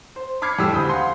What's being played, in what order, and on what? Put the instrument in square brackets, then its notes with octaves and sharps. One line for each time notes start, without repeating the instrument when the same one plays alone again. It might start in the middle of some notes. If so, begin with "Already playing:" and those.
[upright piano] C5
B5 D6 F6 G#6 C7 C#7
F2 A2 G3 G4 E6
D#1 D2 B5 D#6 G6
F5 F#5 B5 C6